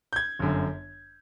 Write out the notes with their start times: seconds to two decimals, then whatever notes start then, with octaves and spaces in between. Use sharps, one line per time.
0.13 G6
0.16 G#6
0.39 G1 F#2 D3